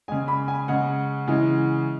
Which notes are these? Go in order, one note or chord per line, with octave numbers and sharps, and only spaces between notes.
C#3 G#3 G#5
B5
G#5
C#3 G#3 F#5
C#3 E3 G#3